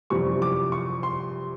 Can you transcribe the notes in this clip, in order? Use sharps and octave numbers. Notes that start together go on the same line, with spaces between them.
F#1 F2 C3 E3 G3 C#6
D6
C#6
C6